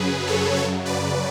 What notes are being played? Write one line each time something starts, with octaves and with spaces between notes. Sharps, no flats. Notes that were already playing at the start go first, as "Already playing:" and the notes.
Already playing: F#2 C#3 F#3 G#4 B4
A4 C#5
F#2 C#3 F#3 A4 C#5
B4 D5